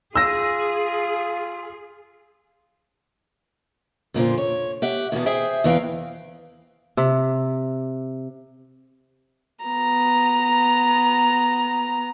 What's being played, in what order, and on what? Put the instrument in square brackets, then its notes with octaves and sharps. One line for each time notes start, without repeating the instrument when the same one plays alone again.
[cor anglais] F4 [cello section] G#4 [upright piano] E6 A#6
[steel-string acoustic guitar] F2 A#2 D3 C5
C#5
G4 E5 F#5
E2 B2 A#3 B3
G#4 C5 E5 G5
E2 E3 F5 G5
[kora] C3
[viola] B3 A#5